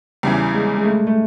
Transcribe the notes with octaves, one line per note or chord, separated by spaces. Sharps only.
E2 C#3 E3 G3
G#3
G#3
A3
A3